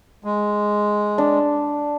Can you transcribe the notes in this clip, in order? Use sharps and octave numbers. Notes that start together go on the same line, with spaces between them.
G#3
D4